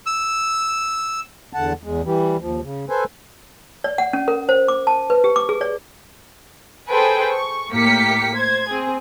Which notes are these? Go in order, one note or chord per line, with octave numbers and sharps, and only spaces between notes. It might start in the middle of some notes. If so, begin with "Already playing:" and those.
E6
E2 D3 F#5 A5
E2 G#3
E3 G3
D#2 F3
C#3
A4 B4 C5 G#5
D5
F#5
C#4
A#4
C5
D6
A5
B4
G4
D6
G#4
D5
G#4 A4 B4 C5 G5 G#5
C#6
A2 A#3 G4 B6 C#7
C5 G#6
C4 G#4